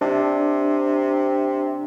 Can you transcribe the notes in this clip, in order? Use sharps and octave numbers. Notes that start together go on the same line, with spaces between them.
C3 D4